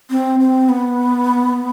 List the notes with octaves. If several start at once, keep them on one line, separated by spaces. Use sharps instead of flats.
C4
C4
B3